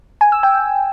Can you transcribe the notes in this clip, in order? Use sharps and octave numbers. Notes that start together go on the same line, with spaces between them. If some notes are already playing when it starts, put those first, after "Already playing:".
G#5
E6
G5